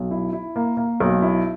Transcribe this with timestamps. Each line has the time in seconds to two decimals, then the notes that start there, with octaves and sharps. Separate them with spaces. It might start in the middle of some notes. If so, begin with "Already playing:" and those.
Already playing: B1
0.11 E4
0.33 E4
0.56 A#3
0.77 A#3
1.00 B1
1.22 E4